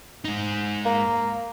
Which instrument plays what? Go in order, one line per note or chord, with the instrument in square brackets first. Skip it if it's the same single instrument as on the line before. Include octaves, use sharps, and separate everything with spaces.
[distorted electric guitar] G#2 D#4
[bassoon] A#3